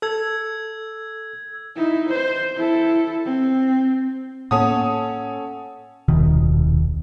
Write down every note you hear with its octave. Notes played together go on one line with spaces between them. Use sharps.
A4 E6 G#6
D#4 E4
C5
E4 A4
C4
A2 A#3 B3 C#4 A4 F#5 D#6
D#1 C2 B2 D#3